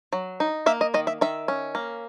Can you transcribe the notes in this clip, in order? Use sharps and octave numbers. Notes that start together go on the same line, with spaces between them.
F#3
D#4
A#3 E5
D#5
D#3 D#5
E5
D#3 E5
C#4
A#3